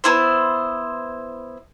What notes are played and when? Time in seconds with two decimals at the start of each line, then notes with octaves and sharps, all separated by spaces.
0.04 B3 E4 C5